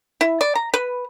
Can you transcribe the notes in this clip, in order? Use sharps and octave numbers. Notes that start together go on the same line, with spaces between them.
E4
D5
A#5
B4